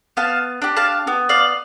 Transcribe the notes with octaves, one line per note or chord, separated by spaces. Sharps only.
B3 F5 A5
D4 G4
F5 A5
B3
D5 F5